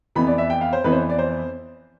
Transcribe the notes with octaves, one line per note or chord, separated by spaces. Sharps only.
F2 E3 B3 B5
D5
E5
G5
F5
C5
F2 E3 B3 B4
C5
D5
C5